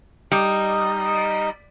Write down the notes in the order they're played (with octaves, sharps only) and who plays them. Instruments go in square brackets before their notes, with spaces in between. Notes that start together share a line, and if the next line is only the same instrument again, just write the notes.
[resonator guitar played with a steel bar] G3 [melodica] D#4 D#5